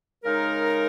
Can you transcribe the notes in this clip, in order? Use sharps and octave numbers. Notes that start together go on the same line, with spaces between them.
C#3 G#3 D#4 A#4